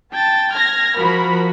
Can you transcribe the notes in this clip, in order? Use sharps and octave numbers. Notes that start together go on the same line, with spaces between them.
G5 A5 A6
F6 G#6 A#6
F3 F#4 A#4 B5